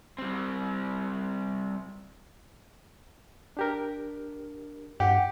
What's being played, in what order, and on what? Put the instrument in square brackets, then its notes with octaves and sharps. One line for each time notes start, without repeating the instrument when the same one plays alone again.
[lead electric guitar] G3 C4
[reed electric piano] D4 G4 A#4
[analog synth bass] G2 [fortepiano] G4 [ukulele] F#5